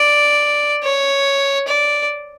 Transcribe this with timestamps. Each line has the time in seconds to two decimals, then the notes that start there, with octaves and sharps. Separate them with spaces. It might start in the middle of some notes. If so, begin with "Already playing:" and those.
Already playing: D5
0.83 C#5
1.67 D5